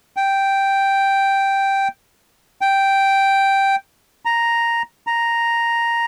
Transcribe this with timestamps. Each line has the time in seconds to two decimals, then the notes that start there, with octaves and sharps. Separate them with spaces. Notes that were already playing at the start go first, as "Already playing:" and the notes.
0.17 G5
2.61 G5
4.25 A#5
5.07 A#5